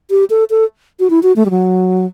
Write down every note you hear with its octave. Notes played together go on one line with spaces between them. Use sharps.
G4
A4
A4
F#4
E4
F#4
A3
G3
F#3